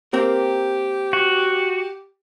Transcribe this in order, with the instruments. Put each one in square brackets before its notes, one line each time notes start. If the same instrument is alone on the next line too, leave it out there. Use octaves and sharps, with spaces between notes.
[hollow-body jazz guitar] A#3 C4 A#4 [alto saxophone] G4
[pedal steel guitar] F#4